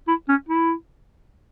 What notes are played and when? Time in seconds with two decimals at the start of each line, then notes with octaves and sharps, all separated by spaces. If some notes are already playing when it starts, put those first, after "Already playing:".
0.08 E4
0.29 C#4
0.49 E4